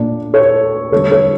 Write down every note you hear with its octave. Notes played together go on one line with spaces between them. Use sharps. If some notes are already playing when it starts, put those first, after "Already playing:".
Already playing: A#2 A3 D4
A4 C#5
D3 G3 A4 C#5
A4 C#5